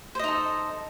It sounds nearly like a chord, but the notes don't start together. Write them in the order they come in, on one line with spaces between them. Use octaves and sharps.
C5 D#5 D#4 A4